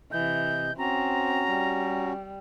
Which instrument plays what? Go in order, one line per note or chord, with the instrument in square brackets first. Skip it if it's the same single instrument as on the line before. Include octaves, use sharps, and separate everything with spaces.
[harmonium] C3 D#5 [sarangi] E3 [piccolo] G6
[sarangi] C4 [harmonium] C#4 F#4 [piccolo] A#5
[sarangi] G3